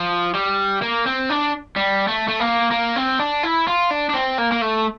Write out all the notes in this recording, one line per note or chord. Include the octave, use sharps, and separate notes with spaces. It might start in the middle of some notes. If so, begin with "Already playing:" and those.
Already playing: F3
G3
A#3
C4
D4
G3
A3
A3
A#3
A#3
C4
D4
E4
F4
D4
D4
C4
A#3
A#3
A3